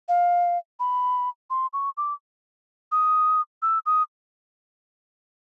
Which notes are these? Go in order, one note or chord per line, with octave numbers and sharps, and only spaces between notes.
F5
B5
C6
C#6
D6
D#6
E6
D#6